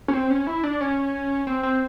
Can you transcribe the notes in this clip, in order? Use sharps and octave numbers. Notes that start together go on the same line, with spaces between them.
C#4
C4
C#4
E4
D4
C#4
C4
C4